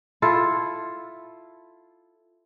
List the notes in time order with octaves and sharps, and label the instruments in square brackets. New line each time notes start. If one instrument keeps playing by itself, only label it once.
[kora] E4 F4 A4